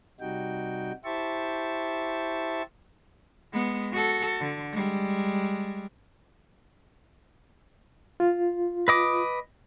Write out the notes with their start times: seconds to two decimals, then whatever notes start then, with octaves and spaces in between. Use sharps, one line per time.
0.20 C3 G3 D#4 F#4 G5
1.04 E4 G4 C5 E5 A5 C#6
3.53 G#3 B3
3.92 F#4 A4
4.41 D3
4.73 G3 G#3
8.20 F4
8.88 B4 D#5 D6